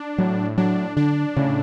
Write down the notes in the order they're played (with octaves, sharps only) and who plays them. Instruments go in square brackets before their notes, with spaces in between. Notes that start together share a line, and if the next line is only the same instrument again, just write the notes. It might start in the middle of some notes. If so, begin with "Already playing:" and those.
Already playing: [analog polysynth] D4
[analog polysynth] A2 [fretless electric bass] F#3
[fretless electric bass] F#3 [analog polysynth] D4
[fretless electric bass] D3 [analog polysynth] D4
[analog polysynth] A2 [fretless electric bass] C#3